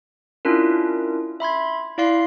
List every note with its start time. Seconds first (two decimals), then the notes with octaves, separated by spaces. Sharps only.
0.45 C#4 D4 E4 F4 A#4
1.40 E5 B5 C6 G#6
1.98 E4 D5 F5 C6 C7